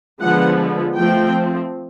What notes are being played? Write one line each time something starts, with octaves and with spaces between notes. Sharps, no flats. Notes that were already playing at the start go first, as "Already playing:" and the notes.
D3 F3 G#3 B3 F#5
F3 A3 C4 G5